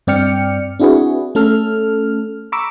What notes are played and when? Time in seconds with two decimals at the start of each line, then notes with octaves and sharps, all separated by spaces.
0.07 G2 C4 D5 G5 F6 C#7
0.79 C4 D4 E4 F#4 G#4 B4
1.35 A3 C#4 A4 F6
2.52 A#5 B5 C#6 D6 E6